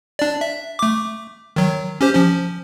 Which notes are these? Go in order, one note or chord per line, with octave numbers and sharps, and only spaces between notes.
D4 D5
E5
A3 D6
D#3 F#3
C#4 G4 C5
F3 C#4